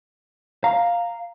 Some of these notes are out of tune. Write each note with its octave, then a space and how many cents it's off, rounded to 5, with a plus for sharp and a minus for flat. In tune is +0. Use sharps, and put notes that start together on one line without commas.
F5 +0 A#5 -5